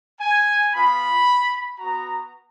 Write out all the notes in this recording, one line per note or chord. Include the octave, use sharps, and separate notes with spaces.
G#5
B3 F4 B5
B3 F#4 A#5